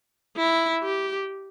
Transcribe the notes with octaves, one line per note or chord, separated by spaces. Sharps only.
E4
G4